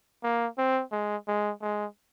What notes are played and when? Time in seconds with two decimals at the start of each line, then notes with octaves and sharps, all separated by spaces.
0.23 A#3
0.58 C4
0.92 G#3
1.28 G#3
1.62 G#3